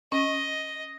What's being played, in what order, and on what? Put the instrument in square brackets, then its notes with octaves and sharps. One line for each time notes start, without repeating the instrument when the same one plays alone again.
[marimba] C#4 [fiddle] D#5